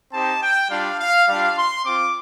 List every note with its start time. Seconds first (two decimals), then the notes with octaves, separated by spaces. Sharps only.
0.13 C4 D#4 G4 A5
0.41 G5
0.70 G3 D4 F4 F5
0.99 F5
1.28 G3 D4 F4 F5
1.57 C6
1.85 C4 F4 D6